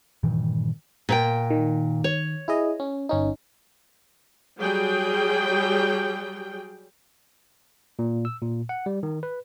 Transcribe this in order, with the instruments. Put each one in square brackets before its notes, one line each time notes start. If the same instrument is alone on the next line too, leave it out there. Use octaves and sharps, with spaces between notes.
[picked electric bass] G2 A#2 D#3 E3
[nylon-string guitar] A#2 B4 G5
[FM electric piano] D#3
[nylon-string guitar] C#5
[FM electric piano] E4 G#4 D#5
C#4
G1 C#4 D#4
[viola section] F#3 G3 G#4 G5
[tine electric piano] A#2
E6
A#2
F#5
G3
D#3
B4